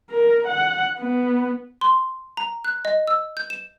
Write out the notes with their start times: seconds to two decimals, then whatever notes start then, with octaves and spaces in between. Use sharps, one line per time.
0.10 A#4
0.47 F#5
0.99 B3
1.81 C6
2.37 A#5
2.64 F#6
2.85 D#5
3.07 E6
3.37 G6
3.50 E7